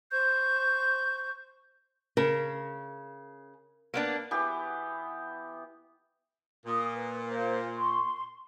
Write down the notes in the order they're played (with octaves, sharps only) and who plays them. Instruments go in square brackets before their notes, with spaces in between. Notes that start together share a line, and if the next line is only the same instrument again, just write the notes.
[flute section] C5 C#6 G6
[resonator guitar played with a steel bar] C#3 [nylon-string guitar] A#4
[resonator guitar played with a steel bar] A#3 B3 D4
[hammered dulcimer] E3 B3 G4
[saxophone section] A#2 [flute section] D#6
[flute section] B4
C5 F5
C6 C#6